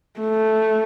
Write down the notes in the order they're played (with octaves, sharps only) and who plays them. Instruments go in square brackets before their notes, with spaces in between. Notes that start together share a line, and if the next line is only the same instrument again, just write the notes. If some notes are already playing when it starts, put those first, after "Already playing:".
[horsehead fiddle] A3